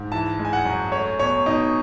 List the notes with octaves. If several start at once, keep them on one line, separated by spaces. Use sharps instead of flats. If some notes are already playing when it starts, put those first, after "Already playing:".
Already playing: G#2
E3 A5
G#3
G#5
F#5
F#2
A3 C#5
B2 C#5
B2 D#4